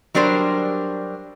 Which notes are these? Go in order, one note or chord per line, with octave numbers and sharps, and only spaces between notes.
F#3 G3 D4 A#4 C5